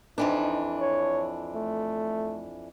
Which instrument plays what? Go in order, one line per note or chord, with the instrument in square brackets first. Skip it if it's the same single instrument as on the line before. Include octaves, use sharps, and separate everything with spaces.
[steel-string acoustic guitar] F2 E3 D4 [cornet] D#4
[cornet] C#5
A3